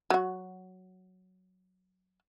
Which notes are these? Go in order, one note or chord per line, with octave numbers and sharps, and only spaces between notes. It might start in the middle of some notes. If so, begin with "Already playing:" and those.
F#3 F#4